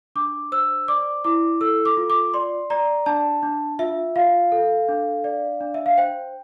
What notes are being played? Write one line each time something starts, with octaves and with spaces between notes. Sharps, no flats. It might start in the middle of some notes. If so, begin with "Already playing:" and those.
D4 D6
C5 E6
D5 D6
E4 D6
A4 E6
D6
F4
D6
D5 C6
D5 A#5
D4 A5
D4
F4 E5
F4 F5
A4
D4
D5
D4
E5
F5
C5 G5